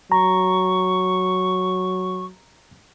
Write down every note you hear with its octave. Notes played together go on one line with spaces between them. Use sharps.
F#3 A#5 C#6